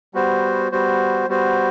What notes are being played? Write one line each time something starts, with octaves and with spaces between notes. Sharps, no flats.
G3 B3 F#4 C5
G3 B3 F#4 C5
G3 B3 F#4 C5